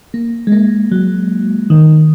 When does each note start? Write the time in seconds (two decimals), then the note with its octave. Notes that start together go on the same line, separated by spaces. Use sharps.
0.14 A#3
0.47 G#3
0.52 A#3
0.91 F#3
1.70 D#3